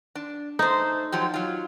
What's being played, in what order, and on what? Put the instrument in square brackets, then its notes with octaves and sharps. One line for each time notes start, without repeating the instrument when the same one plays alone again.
[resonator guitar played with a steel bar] D4
[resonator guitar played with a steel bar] A3 C5 [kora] D#4
[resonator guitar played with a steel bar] F3 F#3 G4
F#3 F4